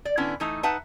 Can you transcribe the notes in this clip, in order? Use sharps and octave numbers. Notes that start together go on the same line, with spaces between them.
D5
D3 B3 C#4 D4 E4
E3 A3 D#4 A#5
D#4 B4 E5 F#5 A5